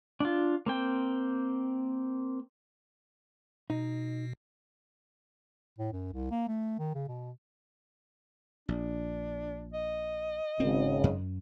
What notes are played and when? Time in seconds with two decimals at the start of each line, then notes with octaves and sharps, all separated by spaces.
0.20 D4 F4
0.66 A#3 C4 G5
3.70 B2 D#4
5.78 A2
5.92 F#2
6.13 C2
6.31 A#3
6.48 A3
6.79 D#3
6.95 C#3
7.08 B2
8.69 A#1 D4
9.73 D#5
10.60 G#1 C#3 C4
11.04 F#2